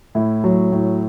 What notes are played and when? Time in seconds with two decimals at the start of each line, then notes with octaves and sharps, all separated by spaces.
0.15 A2 E4
0.44 F#3
0.72 A2